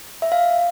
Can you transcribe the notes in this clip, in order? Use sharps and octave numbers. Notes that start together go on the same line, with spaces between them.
E5
F5